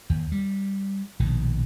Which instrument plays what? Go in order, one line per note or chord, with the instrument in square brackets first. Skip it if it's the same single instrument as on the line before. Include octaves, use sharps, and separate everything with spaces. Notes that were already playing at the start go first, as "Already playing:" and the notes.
[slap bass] D#2
G3
A#1 B2 D#3